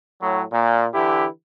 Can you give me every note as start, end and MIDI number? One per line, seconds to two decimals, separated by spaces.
0.22 0.43 45
0.22 0.43 54
0.51 0.86 46
0.94 1.26 50
0.94 1.26 52
0.94 1.26 64
0.94 1.26 67